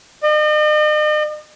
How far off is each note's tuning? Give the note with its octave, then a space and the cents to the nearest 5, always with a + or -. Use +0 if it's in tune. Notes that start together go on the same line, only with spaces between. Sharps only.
D#5 -45